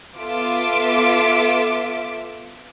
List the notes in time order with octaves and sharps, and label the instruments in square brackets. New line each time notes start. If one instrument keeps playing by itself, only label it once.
[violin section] B3 F4 A4 E5 D6